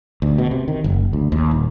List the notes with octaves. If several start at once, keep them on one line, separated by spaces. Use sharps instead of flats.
D2
B2
C3
D#3
F#1
D2
D#2
D#1